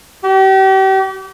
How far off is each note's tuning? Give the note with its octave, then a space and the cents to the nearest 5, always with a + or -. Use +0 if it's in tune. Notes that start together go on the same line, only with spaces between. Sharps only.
G4 -35